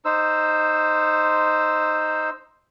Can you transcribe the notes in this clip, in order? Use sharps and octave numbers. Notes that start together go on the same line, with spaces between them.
D#4 C5 E6